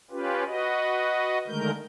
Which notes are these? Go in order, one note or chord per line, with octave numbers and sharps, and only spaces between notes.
C#4 F4 G4 B4
F#4 B4 D#5
D3 D#3 G#3 A3 A#4 G6